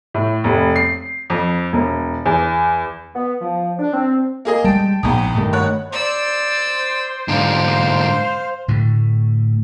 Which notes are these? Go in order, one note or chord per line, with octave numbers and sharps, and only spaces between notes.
A2
F1
C7
F2
E1
E2
B3
F3
D4
C4
A#3 G#4 D#5
G3 G#3 G5 A5
A#1 E2 G#2 G5 B5 D#6
G2 D#3 A3
C#5 F#5 F#6
C5 D5 E6
G#2 D3 F5
A2 D3 A3